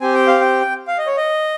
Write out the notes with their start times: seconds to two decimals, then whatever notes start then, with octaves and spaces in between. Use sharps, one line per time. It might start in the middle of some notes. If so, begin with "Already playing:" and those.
0.01 C4 G4 G#5
0.14 G5
0.27 F5
0.41 G5
0.88 F5
0.98 D#5
1.07 C#5
1.17 D#5